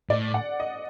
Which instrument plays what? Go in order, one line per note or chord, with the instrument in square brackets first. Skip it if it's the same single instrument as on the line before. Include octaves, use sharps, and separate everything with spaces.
[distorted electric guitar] A2 [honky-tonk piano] D5
[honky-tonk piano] F#5
D#5